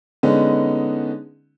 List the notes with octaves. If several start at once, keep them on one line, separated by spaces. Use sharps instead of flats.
D3 G#3 B3 C#4 D#4